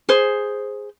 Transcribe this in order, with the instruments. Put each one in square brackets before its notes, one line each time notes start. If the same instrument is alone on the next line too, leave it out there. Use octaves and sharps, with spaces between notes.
[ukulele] G#4 C5